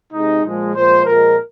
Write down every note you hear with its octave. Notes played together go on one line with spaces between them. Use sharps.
C3 G#3 D#4
A#2 F3 G#3
A#2 F3 G#3 C5
A#2 F3 G#3 A#4